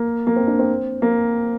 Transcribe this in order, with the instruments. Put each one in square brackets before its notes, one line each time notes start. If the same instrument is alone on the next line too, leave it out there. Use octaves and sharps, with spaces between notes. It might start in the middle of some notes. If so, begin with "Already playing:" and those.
Already playing: [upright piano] A#3
A#3
C4
D4
C4
A#3